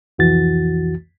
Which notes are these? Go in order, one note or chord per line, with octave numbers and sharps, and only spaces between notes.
C2 F2 E3 F#4 A6